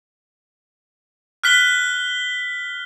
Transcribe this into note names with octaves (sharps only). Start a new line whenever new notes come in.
F6 F#6 B6 G7